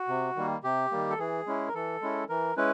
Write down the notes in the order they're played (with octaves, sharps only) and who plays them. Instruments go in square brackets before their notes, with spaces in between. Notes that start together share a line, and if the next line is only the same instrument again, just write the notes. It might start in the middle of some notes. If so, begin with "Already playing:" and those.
Already playing: [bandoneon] F#4
C3
D#3 G3 A#3
C3 G4
D#3 G3 A#3
A4
E3 G#4
G#3 C#4 E4
A#4
E3 A4
G#3 C#4 E4
E3 A#4
G#3 C#4 E4 B4